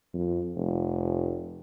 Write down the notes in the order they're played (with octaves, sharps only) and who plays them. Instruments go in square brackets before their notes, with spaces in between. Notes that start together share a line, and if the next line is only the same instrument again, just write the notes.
[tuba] F2
F1